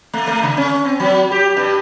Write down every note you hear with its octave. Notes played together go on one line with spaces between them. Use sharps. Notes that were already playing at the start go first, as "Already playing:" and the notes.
A3
A3
C#3
C#4
C4
F#3
G4
G2